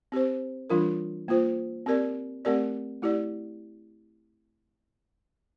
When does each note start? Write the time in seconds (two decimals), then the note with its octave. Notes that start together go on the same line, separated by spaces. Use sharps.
0.12 C4 G4 C5
0.70 E3 G3 D4 F4 A#4
1.28 A#3 F4 C5
1.86 C4 G4 A#4 D5
2.45 A3 C4 G4 A#4 D5
3.02 A3 E4 G4 D5